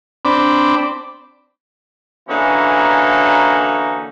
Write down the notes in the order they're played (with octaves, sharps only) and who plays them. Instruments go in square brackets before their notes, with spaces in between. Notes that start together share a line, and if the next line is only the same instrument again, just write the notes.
[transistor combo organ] C4 D4 B5 D6
[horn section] D3 E3 A#3 C#4 D#4 F#4